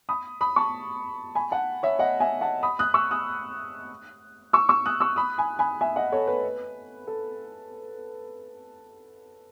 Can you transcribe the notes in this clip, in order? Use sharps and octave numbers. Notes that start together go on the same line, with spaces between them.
B5 D#6
B5 D#6
A5 C#6
G#5 B5
F#5 A5
C#5 E5
D#5 F#5
E5 G#5
F#5 A5
B5 D#6
D#6 F#6
C#6 E6
D#6 F#6
C#6 E6
C#6 E6
D#6 F#6
C#6 E6
B5 D#6
G#5 B5
G#5 B5
E5 G#5
D#5 F#5
A4 C#5
B4
A4